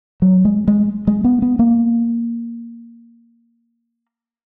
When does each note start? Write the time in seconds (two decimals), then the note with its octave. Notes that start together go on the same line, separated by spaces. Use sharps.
0.22 F#3
0.45 G#3
0.68 G#3
1.07 G#3
1.24 B3
1.42 B3
1.59 A#3